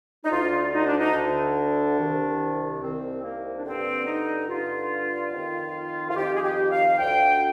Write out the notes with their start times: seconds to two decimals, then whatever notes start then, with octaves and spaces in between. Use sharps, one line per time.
0.25 D#4
0.30 D2 D3 F4
0.73 D#4
0.86 D4
0.98 D#4
1.13 D2 D3 D4
1.97 C2 C3 D#3
2.81 C2 C3 D#3 C4
3.22 A#3
3.56 D4
3.64 G2 D3 C4
4.05 D#4
4.47 G2 D3 F4
5.31 F2 D#3
6.10 F4
6.14 F2 D#3 G4
6.35 G#4
6.42 G4
6.70 F5
6.98 D2 D3 G5